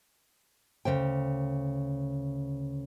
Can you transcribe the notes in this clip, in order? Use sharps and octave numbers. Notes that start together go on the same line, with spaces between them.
D2 G2 C#3 C5 G5